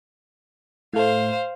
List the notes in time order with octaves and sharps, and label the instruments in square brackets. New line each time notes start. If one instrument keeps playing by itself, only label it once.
[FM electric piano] A2 A3 [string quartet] C5 F5